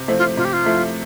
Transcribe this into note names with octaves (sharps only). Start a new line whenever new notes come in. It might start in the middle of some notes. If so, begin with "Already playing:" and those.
Already playing: C3
F3 A3 C4 E4
F4
C3 F4
G4
F4
F3 A3 C4 E4